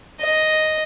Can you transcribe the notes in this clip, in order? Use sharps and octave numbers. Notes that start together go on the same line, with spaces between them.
D#5